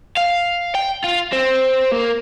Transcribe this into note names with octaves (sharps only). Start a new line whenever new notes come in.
F5
G5
F4
C4
A#3